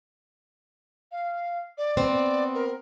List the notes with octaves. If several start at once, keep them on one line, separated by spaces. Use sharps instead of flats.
F5
D5
B3 C4
A#4